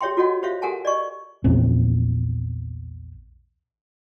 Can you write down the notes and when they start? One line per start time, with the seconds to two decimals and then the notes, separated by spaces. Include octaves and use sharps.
0.01 G4 G#4 C#5 E5 G5 C6
0.17 F4 F#4 A4 C#5 D#5 F#5
0.43 G4 C5 C#5 E5 F5
0.62 G4 A4 A#4 F#5 G#5 A5
0.85 D5 D#5 C#6
1.44 A#1 E2 A#2 C4